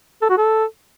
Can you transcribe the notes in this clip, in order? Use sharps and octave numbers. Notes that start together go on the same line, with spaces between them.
A4
F#4
A4